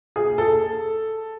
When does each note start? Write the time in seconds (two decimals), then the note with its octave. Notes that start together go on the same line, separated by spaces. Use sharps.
0.16 G#4
0.38 A4